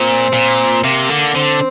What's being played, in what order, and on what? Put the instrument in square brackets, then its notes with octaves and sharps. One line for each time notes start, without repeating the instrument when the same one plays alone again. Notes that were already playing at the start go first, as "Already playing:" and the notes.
Already playing: [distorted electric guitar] A#2 [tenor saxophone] C4
[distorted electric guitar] A#2
[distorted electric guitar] C3 [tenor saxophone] A#3
[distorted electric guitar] D3
[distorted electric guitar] D3 [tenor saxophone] C4